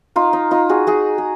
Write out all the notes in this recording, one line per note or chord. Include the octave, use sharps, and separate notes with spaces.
D#4 F4
D#4
D#4 F4
F#4 G#4
F#4 G#4
G#4